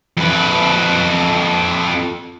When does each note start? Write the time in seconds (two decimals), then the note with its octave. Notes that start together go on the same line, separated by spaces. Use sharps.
0.17 F2 B4